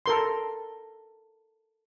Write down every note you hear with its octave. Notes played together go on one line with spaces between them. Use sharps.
A4 A#4 C6